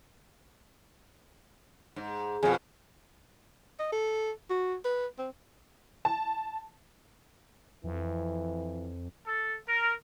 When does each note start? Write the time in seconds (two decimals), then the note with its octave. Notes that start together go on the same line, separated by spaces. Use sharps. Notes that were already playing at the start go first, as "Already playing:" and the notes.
1.96 G#2
2.43 F2 B2 G#4
3.79 D#5
3.92 A4
4.50 F#4
4.85 B4
5.19 C4
6.05 A5
7.84 F2 E3
9.27 A4
9.68 A#4